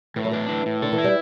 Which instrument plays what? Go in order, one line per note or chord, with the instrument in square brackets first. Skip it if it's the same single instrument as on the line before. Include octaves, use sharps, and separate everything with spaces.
[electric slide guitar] A2 [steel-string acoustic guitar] E3
[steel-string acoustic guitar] F#3
[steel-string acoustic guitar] E3 [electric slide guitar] D4
[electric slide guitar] A2
A2
[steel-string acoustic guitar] D3 [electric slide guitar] A4
[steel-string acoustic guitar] E3
[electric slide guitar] E4
[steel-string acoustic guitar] G3